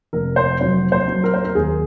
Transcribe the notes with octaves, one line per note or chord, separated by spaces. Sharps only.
F1 A#4
C5
F#3 C5
C5
F#3
A#4
C5
A#4
D#2 G#4